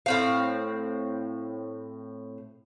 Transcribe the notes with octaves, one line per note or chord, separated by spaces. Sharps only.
A2 C4 F5